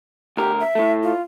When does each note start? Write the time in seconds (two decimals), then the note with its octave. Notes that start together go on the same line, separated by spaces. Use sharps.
0.37 D2 G4 A#4
0.60 E5
0.75 A2 A3
1.03 F4